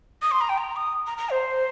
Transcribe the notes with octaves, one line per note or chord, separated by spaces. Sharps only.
D#6
C6
A#5
G5
A#5
D#6
A#5
A#5
C5